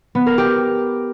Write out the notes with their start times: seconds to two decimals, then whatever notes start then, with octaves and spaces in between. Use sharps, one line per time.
0.15 B3
0.26 A#4
0.38 G4